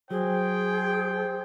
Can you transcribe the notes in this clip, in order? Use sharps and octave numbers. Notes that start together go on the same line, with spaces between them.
F#3 G#4 C5 G5